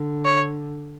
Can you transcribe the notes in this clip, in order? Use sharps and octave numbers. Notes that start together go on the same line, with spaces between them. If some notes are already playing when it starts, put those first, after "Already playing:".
Already playing: D3
C#5